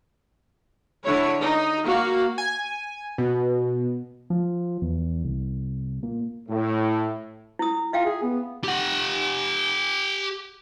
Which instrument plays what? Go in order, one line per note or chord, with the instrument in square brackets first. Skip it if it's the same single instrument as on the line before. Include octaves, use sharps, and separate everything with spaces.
[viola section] D3 E4 C#5
D#4
A#3 F#4 F5
[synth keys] G#5
B2
[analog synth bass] F3
E2
C2
A#2
[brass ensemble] A2
[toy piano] E4 D#6
[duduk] F4 [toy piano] E5 F5 G5
[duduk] G#4
B3
[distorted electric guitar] G4 F#5